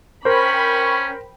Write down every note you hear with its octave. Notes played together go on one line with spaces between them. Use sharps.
C#4 A#4 C5 G5 B5 C#6